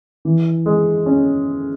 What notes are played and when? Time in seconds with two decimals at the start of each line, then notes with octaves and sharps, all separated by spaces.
0.25 E3
0.66 G#3
1.06 C#4